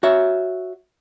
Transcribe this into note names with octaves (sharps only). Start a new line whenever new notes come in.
F#4 C#5 E5